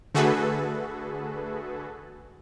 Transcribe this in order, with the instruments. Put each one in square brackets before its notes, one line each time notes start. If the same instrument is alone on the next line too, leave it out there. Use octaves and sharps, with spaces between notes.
[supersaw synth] D3 A3 F#4 G#4 A4 B4